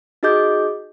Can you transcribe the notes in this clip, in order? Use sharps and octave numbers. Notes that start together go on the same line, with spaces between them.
D#4 F#4 G#4 D#5 D6 G6